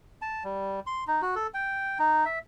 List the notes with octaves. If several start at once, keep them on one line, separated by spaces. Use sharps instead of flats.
A5
G3
C6
D#4
F#4
A4
G5
D#4
E5